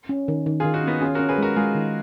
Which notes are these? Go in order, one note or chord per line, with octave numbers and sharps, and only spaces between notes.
C#4
D#3
D#3
D#3 F4 G#4
D#4 F#4
B3 C#4 D#4
C#4 F4 G#4
C#4 F#4 A#4
G#4 B4
G#3 F#4 A#4
G#3 F4 G#4
D#3